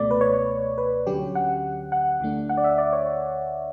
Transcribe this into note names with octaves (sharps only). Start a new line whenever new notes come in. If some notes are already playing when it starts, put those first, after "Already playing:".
Already playing: C#2 B2 A3 D5
B4
C#5
B4
D2 D3 F#3 C#4 G4
F#5
F#5
D2 D3 A3 D4
F#5
D5
E5
D5
C#5